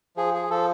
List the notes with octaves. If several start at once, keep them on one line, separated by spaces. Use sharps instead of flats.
F3 G#4
G#4
F3 A4